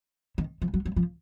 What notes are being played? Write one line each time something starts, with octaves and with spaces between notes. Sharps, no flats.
D#3
F3
F#3
F#3
F3